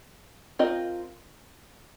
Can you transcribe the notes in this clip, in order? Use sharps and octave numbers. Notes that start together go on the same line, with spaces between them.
C4 F4 A#4 D#5